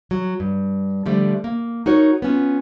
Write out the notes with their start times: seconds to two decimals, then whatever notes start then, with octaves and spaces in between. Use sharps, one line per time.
0.11 F#3
0.40 G2
1.06 D3 F3 G3 A3
1.44 A#3
1.86 D#4 F#4 A#4 C#5
2.22 B3 C#4 F4